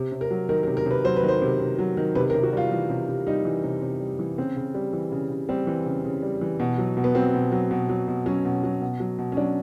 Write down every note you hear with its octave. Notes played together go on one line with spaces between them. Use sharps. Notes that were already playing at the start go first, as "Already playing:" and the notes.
Already playing: C3
C3
A#4
F#3
D#3 A#4
A#4
C3
A#4
C3 B4
F#3 C5
B4
D#3
C5
C3
C3
F#3
D#3
C3 B4
A#4
C3
F#4
G3 F4
E3
C3
C3
G3 D#4
E3
C3
C3
G3
E3
C#3 C4
C#3
G3
E3
C#3
C#3
G3 C4
E3
C#3
C#3
G3
E3
B2
F#3
B2
B3
F#3 C4
B2
F#3
B2
F#3
B2
F#3 C#4
B2
F#3
B2
F#3
B2
C#4
F#3 D4